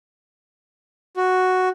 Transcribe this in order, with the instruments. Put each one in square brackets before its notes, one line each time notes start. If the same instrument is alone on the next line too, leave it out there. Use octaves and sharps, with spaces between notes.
[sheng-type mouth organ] F#4